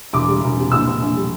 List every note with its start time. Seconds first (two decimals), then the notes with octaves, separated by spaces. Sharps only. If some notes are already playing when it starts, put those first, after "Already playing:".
0.13 E1 D6
0.28 G3
0.43 E1
0.57 C3
0.72 A#1 E6
0.87 A#1
1.02 A#1
1.16 G3